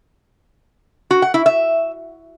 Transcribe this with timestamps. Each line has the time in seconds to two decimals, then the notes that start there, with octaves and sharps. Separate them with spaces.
1.11 F#4
1.22 F#5
1.34 E4
1.46 E5